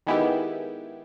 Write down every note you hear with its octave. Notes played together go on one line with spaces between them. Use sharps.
D#3 G#3 B3 E4 G4